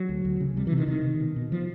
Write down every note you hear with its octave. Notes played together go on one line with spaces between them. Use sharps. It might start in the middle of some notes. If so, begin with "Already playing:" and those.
Already playing: F#3
D2
D2
C#3
C3 G3
E3
C3
D#3
C3 D#3
C3
B2
B2
B2 F3